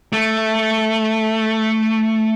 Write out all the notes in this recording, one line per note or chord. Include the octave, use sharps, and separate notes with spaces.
A3